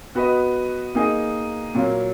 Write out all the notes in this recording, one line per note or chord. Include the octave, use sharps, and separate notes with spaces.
B3 F#4 B4 D#5
A#3 D#4 G#4 D#5
A#2 F#3 A#3